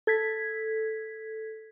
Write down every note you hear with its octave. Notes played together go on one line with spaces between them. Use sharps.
A4 G#6 B6